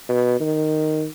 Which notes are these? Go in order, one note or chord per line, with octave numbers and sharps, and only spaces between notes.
B2
D#3